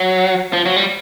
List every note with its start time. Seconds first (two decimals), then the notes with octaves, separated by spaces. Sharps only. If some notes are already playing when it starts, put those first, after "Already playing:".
Already playing: F#3
0.53 F3
0.66 F#3
0.76 G3